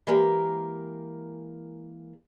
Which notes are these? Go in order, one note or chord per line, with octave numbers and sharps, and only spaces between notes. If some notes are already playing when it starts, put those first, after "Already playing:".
E3 G#3 A#3 G4 A#4